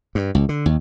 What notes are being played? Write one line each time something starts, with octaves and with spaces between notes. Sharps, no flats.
G2
C#2
D3
D#2